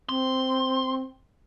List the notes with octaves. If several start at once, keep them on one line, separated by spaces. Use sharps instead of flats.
C4 C6